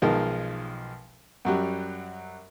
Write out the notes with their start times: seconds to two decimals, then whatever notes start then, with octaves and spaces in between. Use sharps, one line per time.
0.02 B1 D#3 F3 G#3 A#4
1.45 F#2 F#3 G3